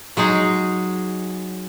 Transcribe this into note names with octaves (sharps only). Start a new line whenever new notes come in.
F#3 G#3 D#4 G#4